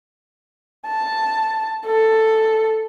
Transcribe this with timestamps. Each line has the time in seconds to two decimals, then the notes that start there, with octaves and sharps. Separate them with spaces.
0.87 A5
1.86 A4